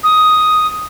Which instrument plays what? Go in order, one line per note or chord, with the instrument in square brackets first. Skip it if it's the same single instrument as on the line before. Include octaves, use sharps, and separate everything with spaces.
[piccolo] D#6